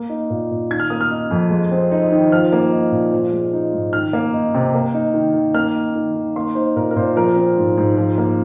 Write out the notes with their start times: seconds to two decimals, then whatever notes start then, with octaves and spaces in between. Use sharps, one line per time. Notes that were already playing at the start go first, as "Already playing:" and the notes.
Already playing: A#3
0.10 D#4
0.30 A#2
0.51 A#2
0.71 D#3 G#6
0.80 F6
0.90 A#3 D#6
1.01 F6
1.11 D#4
1.31 F2
1.50 G#3
1.71 C4
1.92 D#4
2.12 D#3
2.32 F3 F6
2.53 A#3
2.72 D#4
2.92 A#2
3.12 F3
3.32 G#3
3.53 D#4
3.73 G#2
3.93 D#3 F6
4.13 A#3
4.34 D#4
4.54 C3
4.75 A#3
4.94 D#4
5.14 D#3
5.34 D#3
5.54 A#3 F6
5.75 D#4
5.95 D#3
6.15 D#3
6.36 A#3 C6
6.55 D#4 C5
6.76 A#2 A#4
6.91 A#4
6.96 A#2 C5
7.16 F3 A#4
7.36 C4
7.57 G#2
7.78 G#2
7.97 F3
8.18 A#3